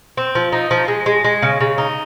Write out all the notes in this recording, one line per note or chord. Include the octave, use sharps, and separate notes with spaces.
C4
F3
D#4
F3
G#3
G#3
G#3
C#3
C#3
D#4